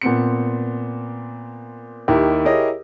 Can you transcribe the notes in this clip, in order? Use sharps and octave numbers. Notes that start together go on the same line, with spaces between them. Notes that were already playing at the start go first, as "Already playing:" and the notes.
A#2 B3 C4 C#7
D#2 D#3 E4 G4
E4 G4 G#4 A#4 C#5 D#5